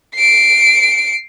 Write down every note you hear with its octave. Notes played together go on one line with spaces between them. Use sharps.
C7 D7